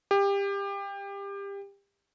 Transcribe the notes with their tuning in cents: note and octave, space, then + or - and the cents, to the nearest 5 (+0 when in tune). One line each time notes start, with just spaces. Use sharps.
G4 +25